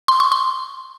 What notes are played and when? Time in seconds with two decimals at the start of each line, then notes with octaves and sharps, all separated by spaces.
0.08 C6
0.20 C#6
0.32 C6